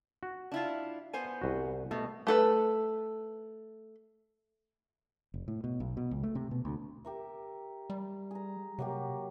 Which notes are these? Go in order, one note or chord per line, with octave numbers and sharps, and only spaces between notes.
F#4
D4 E4 F4
B3 C5 G#5
C2 F#4
B2 A3
A3 A4 B4
F1
A2
B2
B1
B2
C#2
A3
C3
B2
D2
G4 A#4 E5
G3
G#4 A#5
C3 F#3 A#3 G4